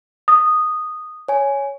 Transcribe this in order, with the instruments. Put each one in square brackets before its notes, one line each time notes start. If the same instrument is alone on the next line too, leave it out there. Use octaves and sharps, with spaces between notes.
[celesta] D#6
[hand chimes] C#5 G#5